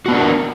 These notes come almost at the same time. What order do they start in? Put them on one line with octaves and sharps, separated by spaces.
F#4 B3 D4 A#4 B4